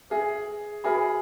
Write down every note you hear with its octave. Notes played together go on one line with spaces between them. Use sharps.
G#4 B4 E5 G#5
F#4 G#4 B4 E5 G#5 B5